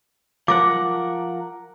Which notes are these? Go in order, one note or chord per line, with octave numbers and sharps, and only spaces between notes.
F3 A#4 F#5 D6